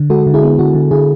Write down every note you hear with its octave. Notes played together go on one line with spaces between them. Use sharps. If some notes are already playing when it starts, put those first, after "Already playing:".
Already playing: D3
G#3 F#4 A4
D3
E4 G#4
B3
D3 F#4
D3
D3 E4 G#4